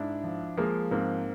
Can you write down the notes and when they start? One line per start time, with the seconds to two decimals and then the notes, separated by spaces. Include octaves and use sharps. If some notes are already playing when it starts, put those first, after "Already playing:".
Already playing: G#2 D4 E4
0.23 F3
0.57 F3 G#3 A#3
0.91 G#2 A#3 C4